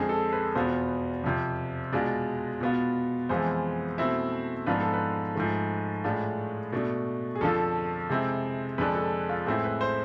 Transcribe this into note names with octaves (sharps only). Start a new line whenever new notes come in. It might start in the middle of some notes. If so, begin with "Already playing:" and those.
Already playing: F2 D3 G#3 C4 G#4
A4
B4
E2 B2 B3 F4 C5
F2 C3 F3
B2 G#3 D4 F4 D5
B2 B3 F4
F2 E3 G#3 B3 F4 C5
B2 A3 C4 E4
G#2 F3 B3 D4 F4 B4
A4
B4
G#2 F3 A3
A2 G#3 D4 F4
B2 A3 D4
G#4
F2 D3 F3 A4
C3 G#3 C4 E4
F2 D3 G#3 D4 B4
A4
F4
A2 G#3 C4 E4
B4
C5